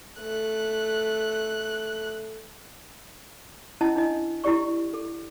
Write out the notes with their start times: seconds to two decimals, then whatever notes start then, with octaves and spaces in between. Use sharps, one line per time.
0.19 A3 F#6
3.81 C#4 E4 D#5 A5
3.96 D4 E4 D#5
4.44 E4 F#4 G4 D5 C#6
4.94 A4